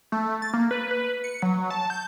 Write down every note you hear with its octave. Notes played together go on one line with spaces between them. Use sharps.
A3
A6
A#3
B4
B4
C#7
F#3
A5
G6